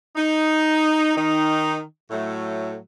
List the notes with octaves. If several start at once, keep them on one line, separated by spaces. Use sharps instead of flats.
D#4
D#3 D#4
A2 F#3 A3